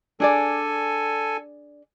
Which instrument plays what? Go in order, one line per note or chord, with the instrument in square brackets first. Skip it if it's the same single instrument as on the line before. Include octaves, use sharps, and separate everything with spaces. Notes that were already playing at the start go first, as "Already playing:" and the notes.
[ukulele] D4 G#4 D5 [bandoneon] A4 G#5